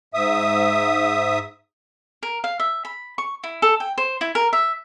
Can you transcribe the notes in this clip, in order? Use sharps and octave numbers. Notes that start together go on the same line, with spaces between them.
G#2 E5 D#6
A#4
F5
E5
B5
C#6
E4
A4
G5
C5
E4
A#4
E5